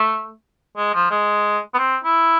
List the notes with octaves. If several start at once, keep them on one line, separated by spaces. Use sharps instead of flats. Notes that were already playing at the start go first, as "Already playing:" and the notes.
Already playing: A3
G#3
F3
G#3
B3
C4
E4